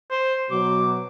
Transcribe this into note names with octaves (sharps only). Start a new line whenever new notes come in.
C5
B2 F#3 D6